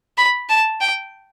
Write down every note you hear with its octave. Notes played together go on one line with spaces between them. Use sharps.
B5
A5
G5